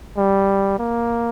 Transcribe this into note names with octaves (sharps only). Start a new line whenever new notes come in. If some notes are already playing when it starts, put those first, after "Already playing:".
G3
A#3